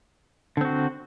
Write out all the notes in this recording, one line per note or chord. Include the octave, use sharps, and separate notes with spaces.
D3 C4 F#4